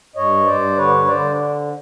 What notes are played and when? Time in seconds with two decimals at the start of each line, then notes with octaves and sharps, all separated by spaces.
0.16 G2 C#5 D#5
0.46 G2 C5 D5
0.77 D3 B4 C#5
1.07 D3 C5 D5